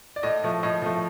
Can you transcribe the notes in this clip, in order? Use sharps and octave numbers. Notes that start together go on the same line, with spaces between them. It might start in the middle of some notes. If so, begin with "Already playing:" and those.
D5
A2 D#5
F3 A3
A2 D#5
F3 A3